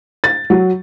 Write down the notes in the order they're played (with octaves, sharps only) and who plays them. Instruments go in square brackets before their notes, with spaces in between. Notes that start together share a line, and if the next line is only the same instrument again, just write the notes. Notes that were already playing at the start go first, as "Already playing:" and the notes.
[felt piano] A6
F#3